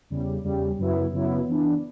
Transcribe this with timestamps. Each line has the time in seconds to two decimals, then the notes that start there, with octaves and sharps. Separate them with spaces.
0.10 E2 C#3 G3
0.44 E2 C#3 G3
0.78 F#2 C#3 F#3 B3 E4
1.13 F#2 C#3 F#3 B3 E4
1.47 E3 B3 D4